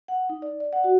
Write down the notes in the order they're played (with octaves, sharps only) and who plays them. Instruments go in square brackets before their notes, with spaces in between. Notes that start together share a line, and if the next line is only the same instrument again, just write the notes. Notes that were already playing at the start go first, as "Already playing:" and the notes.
[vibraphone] F#5
D#4
D5
D5
F#5
F#4